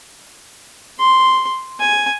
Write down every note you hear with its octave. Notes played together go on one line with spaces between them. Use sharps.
C6
G#5